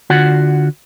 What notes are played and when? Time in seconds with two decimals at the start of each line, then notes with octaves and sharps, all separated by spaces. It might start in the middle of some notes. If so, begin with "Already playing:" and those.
0.10 D3 F4 F#4 F#5